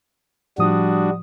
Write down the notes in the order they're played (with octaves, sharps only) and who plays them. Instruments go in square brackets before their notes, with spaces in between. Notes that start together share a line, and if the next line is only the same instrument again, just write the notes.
[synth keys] A2 F3 D#6 [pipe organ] G3 D4 F#4